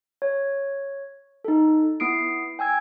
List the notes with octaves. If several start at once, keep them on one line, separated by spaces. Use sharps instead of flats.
C#5
D#4 A4
B3 E4 D#6 C7 D7
G5 G#5 E6 G#6